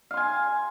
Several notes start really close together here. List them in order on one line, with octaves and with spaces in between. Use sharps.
F5 C6 G#5